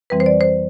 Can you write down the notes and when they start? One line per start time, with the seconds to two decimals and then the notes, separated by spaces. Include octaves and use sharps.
0.10 F2 E3 G3 C4 B4
0.20 C5
0.26 D5
0.41 C5